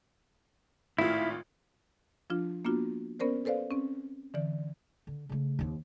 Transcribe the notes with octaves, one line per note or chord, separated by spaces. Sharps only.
G#1 A2 E4 F4
F3 D4 F4
A#3 B3 D4 F4 F#4
B3 C#4 A#4 C5 D5
A4 B4 C5 D5 F5
C4 C#4
D3 E3 D5
D3
C#3 A3
D#2 C4